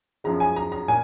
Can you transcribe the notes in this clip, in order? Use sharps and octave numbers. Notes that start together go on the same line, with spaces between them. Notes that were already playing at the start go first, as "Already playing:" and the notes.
F#2 F3 G#3 A#5
G#5
A#5
A#5
A#2 G#5